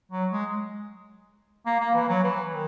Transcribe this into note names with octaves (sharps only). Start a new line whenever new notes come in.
F#3
G#3
A#3
A#3
E3
F#3
E3
D#3